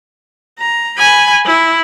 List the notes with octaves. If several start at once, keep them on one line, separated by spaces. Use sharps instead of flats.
A#5
G#5 B5
E4